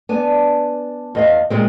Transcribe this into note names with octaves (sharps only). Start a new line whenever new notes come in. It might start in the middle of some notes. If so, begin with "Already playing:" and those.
B3 D4 G#5
E2 D#5 F5
A#2 G#3 C4